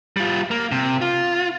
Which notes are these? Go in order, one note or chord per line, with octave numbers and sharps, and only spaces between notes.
G3 F4
A#3
C3
F4